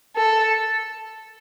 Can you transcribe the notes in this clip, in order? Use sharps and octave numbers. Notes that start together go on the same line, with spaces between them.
A4